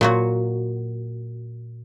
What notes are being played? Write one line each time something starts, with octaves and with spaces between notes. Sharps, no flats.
A#2 F#3 F#4